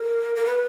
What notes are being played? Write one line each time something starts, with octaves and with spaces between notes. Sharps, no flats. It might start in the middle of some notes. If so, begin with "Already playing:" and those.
Already playing: A#4
A#4
B4